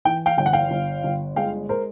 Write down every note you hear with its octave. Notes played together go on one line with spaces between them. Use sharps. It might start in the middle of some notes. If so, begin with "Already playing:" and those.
E3 G5
F5 G5
G1 G5
F#5
F5 G5
G1
G1
G#3 F5 G5
A#4 C5